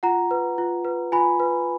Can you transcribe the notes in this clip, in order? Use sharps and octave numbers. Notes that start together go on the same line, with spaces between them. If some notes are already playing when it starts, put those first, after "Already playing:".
F4 F#5 A#5
B4
F4
B4
F4 G#5 B5
B4